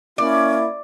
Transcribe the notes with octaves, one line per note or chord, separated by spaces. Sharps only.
A#3 C#4 E4 D5